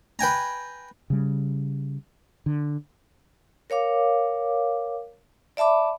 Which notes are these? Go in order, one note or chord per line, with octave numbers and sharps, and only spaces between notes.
B4 G5 G#5 A#5
C#3 G3
D3
A#4 C#5 F5 D6
D5 E5 A5 B5 D6